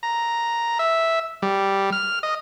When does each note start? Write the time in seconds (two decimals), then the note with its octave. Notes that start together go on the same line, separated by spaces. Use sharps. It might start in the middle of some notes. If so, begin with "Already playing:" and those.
0.03 A#5
0.79 E5
1.42 G3
1.92 F6
2.23 D#5